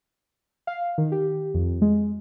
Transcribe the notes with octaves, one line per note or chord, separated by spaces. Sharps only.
F5
D#3
G4
F2
G#3